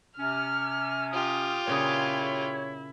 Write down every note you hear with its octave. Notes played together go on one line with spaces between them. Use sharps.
C3 C#4 F6
F4 G4 D#6
A#2 C#3 E4 G#4 C#5